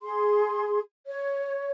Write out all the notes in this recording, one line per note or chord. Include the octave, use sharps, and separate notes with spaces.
G#4 C6
C#5